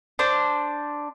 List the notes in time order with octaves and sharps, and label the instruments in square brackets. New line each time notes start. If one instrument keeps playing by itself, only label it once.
[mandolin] D4 C5